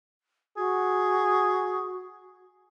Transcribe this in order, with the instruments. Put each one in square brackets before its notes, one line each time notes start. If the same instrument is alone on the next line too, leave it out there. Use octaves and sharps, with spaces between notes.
[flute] F#4 [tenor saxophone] G#4